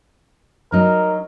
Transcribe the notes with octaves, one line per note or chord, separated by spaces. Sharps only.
F#3 D#4 A#4